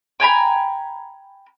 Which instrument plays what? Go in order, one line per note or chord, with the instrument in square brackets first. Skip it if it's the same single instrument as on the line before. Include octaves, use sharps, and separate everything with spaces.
[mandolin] G5 G#5 A#5 B5